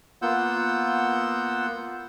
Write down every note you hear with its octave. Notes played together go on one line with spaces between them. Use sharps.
A#3 B3 F4 F#5 E6 G6